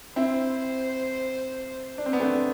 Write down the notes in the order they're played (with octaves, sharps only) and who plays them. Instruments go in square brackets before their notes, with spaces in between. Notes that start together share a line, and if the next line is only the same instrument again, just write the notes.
[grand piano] C4 E4 [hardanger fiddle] C5
[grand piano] D4
C4
B3 D4
A3 C4